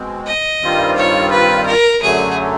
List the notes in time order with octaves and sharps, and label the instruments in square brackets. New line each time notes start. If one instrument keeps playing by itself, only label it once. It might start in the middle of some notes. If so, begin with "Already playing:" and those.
Already playing: [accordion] B2 G#3 C4
[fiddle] D#5
[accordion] G2 D#3 G3 C4 F4
[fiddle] C#5
B4
A#4
[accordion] F#2 D3 F#3 A3 [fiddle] G#4